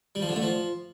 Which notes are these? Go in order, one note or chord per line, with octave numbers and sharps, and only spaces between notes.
G3
F3
D3
A3
F3